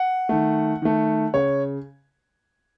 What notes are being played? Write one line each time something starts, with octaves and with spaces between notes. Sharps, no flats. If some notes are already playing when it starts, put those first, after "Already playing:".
Already playing: F#5
D#3 A3
D#3 A3
C#3 C#5